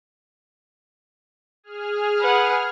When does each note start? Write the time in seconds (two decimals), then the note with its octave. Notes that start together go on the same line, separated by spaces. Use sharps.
1.64 G#4 F6
2.20 B4 F#5